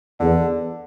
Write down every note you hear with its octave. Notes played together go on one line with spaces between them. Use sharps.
E2 D3